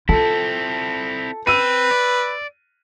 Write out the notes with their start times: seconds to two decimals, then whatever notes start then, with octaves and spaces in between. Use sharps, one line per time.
0.09 C4 E4 F4 A4
1.47 C4 B4 E6 D#7
1.91 D5